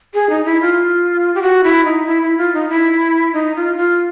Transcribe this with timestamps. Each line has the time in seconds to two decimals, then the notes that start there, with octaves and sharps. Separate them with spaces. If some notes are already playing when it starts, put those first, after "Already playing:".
0.14 G#4
0.30 D#4
0.46 E4
0.61 F4
1.35 G4
1.42 F#4
1.64 E4
1.85 D#4
2.06 E4
2.22 E4
2.38 F4
2.54 D#4
2.69 E4
3.33 D#4
3.56 F4
3.77 F4